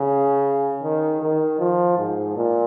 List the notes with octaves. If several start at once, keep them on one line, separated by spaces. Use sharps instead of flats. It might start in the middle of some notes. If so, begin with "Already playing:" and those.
Already playing: C#3
D#3
D#3
F3
G#2
A#2